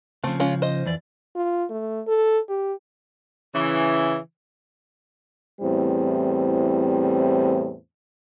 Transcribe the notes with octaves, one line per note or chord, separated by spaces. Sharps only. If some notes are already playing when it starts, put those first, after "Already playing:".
C#3 F3 A3 C4
G#3 C#4 F4
C5 D#5
F2 E3 D5
F4
A3
A4
G4
C#3 E3
E2 A2 G3 C4 C5